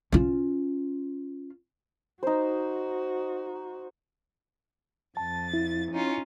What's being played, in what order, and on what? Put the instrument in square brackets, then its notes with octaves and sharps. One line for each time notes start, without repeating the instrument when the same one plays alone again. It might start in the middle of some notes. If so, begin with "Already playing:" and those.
[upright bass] C#4 F4
[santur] D#4 C5 [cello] F#4
[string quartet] F2 A6 [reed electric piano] A5
[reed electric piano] E4
[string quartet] C#4 D#4 F4